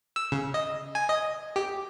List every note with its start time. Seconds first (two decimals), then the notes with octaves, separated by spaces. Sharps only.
0.16 E6
0.32 C#3
0.54 D#5
0.95 G#5
1.09 D#5
1.56 G4